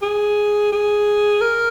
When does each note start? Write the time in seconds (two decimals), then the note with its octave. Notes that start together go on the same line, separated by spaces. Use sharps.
0.02 G#4
0.72 G#4
1.41 A#4